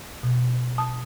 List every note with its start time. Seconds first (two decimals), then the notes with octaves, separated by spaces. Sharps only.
0.23 B2
0.78 A5 D#6